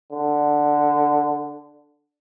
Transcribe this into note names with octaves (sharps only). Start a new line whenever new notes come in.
D3